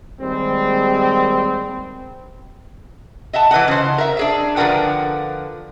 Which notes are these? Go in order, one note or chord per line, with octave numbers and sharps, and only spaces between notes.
D#2 G3 G#3 C4
D#5 E5 F#5 A5
E3 B4 D#5 F#5
C#3 C5
A#4 E5
D4 G#4 E5
D3 F3 A#4 B4 F#5 G5